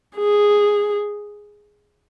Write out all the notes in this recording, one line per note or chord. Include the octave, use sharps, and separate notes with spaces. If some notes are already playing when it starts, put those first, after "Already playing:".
G#4